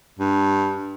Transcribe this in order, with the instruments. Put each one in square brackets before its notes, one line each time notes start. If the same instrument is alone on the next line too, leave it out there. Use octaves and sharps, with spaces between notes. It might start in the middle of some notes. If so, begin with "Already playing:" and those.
[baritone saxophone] G2